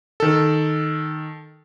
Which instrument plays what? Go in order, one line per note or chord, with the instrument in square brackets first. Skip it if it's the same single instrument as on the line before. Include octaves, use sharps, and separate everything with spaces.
[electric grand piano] D#3 A4